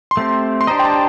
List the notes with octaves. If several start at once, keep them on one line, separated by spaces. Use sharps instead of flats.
C6
A3 C4 G4
C6
D4 G4 C5 D#5 A#5
G5
A5